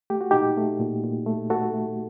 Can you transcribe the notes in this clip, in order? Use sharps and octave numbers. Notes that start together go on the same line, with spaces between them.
A3 G4
F#4
A#2 D#4 G4
A3
A#2
A#2
A3
A3 F#4 A4
A3